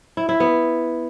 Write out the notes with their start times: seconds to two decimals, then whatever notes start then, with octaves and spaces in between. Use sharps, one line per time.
0.17 E4
0.29 E4
0.40 B3